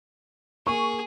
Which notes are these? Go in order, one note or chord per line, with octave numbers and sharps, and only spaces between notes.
A#3 G#4 C#6